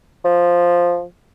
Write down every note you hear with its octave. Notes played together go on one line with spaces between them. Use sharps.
F3